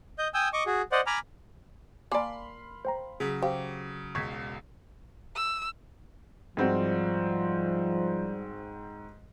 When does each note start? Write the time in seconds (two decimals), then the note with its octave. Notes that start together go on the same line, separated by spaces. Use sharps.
0.19 D#5 G6
0.34 G5 G#5 D#6 E6 G6
0.53 D#5 C#6 D6
0.66 F#4 G#4
0.92 C5 D5 D#5 F#5
1.07 G#5 A#5 B5 D6 F6
2.12 A#3 D5 F5 G#5 A5 B5 C6
2.85 C5 G5 A#5
3.20 C#3 F#3 G#4 B6
3.43 G4 C5 F5
4.15 E1 C#2 C#6 G#6 B6
5.36 E6
6.57 G#2 F3 G3 C4 F#4